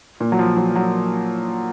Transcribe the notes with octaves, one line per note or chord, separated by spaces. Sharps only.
A#2
F#3
F3
F#3
F#3